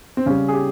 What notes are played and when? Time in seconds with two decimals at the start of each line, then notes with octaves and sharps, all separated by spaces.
0.17 C4
0.26 C#3 C#4
0.30 G3
0.48 G#4
0.53 G4